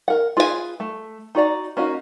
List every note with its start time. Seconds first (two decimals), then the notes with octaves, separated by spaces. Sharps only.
0.08 A#4 F#5
0.37 F4 G#4 B4 C#5 G#5
0.80 A3
1.35 D#4 F#4 D5 A#5
1.77 A#3 C#4 D#4 F#4